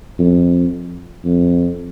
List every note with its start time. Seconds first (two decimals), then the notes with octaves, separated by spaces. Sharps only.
0.19 F2
1.24 F2